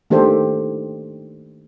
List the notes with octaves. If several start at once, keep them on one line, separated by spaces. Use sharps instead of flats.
D#3 A3 D4 G4 A4 C5